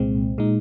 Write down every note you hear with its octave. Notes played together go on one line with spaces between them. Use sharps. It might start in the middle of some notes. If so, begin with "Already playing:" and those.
Already playing: C2 A#2 G#3 C4
A#2 G#3 D#4